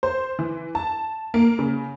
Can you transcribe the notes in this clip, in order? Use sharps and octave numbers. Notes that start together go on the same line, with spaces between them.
C5
E3
A5
A#3
C#3